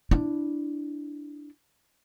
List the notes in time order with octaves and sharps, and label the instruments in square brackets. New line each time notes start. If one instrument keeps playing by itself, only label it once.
[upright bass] D4 E4